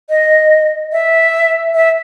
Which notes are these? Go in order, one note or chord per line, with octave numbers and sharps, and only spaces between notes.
D#5
E5
E5